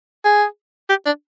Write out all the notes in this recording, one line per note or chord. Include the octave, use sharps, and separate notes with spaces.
G#4
G4
D4